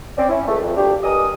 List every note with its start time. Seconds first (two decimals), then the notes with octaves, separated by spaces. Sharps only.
0.18 C4 C#4 D5
0.29 C#4 E4
0.48 C#2 A3
0.61 F2
0.76 D2 A#2 G3 D4 G4
1.03 G2 A#4 D5 D#5 G#5 D#6